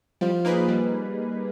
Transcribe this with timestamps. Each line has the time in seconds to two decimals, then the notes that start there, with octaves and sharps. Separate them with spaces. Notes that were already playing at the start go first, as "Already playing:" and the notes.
0.21 F3 G3
0.45 A#3 D#4 G#4 B4
0.68 G3